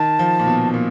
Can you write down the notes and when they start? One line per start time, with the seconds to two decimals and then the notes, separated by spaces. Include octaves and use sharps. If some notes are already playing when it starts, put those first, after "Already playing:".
Already playing: D#3 A5
0.19 F3
0.40 A#2
0.46 B2
0.74 A#2